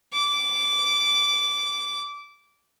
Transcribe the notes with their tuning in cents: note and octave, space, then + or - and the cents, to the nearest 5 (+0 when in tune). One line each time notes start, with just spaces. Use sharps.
D6 -15